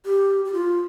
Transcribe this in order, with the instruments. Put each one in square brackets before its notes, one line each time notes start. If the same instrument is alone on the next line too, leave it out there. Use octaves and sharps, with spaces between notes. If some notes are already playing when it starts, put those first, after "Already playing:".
[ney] G4
G4
F4